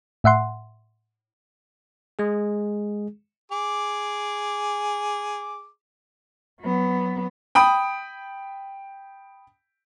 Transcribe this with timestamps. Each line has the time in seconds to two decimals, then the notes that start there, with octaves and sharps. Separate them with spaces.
0.24 A2 E5 F#5 C6
2.19 G#3 G#4
3.52 G#4 D6
6.61 F#3 B3
7.55 G5 B5 D#6